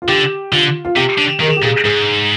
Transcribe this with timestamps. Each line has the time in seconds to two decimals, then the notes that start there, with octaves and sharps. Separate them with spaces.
0.02 F4
0.08 D3 G4
0.52 D3 F4
0.85 F4
0.96 C3 G4
1.18 D3
1.40 D#3 A#4
1.48 G#4
1.56 G4
1.62 A#2 G#4
1.85 G#2 G#4